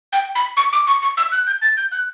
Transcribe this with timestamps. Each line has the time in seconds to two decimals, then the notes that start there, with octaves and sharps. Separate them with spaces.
0.13 G5
0.35 B5
0.57 C#6
0.73 D6
0.87 C#6
1.02 C#6
1.17 E6
1.32 F#6
1.47 G6
1.62 A6
1.77 G6
1.92 F#6